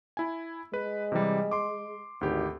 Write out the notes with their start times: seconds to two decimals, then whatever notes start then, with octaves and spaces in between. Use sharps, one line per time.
0.17 E4 G#5
0.74 G#3 B4
1.12 C3 E3 G3
1.51 C6 D6
2.21 G#1 D2 G4